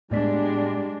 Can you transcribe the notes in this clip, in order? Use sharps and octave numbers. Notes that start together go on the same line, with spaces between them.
A2 G3 G#3 B3 D4 D5 B6